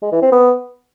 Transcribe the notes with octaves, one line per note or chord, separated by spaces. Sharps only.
G#3
E3
C4
B3